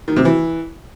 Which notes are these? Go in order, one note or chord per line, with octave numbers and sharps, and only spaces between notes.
D#3
C3
E3